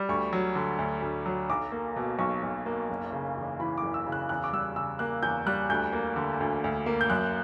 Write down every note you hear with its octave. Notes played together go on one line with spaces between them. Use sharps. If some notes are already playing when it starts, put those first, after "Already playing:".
Already playing: G3
D2 C#6
F#3
D3
D2
D2
F#3
B1 D6
A#3
B2
B1 C#6
B1
A#3
F#1
C#3
E2
E3 B5
F#1 D6
E6
C#3
F#6
E2 F#6
D6
G3 E6
C#3 E6
A#3 F#6
E2 G6
G3 F#6
D2 G6
A#3
D3
D2
D2
A#3
G6
F#2 F#6